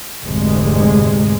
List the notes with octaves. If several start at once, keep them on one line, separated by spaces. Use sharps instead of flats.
F1 D2 G#2 C3 G#3